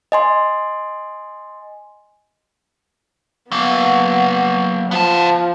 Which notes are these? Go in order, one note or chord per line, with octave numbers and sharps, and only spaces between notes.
D#5 G#5 C6
F#3 A#3 B3
F3 B3 A5